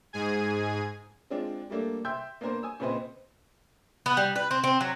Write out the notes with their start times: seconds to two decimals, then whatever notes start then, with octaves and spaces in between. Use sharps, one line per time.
0.13 G#2 G#4 G#5
1.30 G#3 C4 D4 F4
1.70 G3 A3 A#3 D4 A4
2.05 E5 G5 C6 E6 G6
2.41 A#3 B3 D4 A#4 C5
2.63 G#5 D#6 E6
2.80 A#2 C#3 C4 B4 C5 D#5
4.06 B3
4.17 G3
4.36 B4
4.51 C4
4.64 C4
4.81 F#3